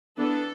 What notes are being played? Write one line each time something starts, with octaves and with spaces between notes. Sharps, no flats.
E3 B3 D4 A4